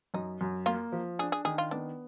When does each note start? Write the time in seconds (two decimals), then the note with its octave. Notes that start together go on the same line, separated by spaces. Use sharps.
0.14 F#2 D#4
0.41 F#2
0.66 A#3 F4
0.92 F3
1.19 D4 G#4
1.32 G#4
1.45 D#3 G#4
1.58 F4
1.71 B3 D4